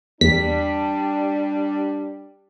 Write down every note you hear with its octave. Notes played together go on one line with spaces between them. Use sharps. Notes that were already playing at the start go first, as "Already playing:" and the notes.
E2 G3 D4 B6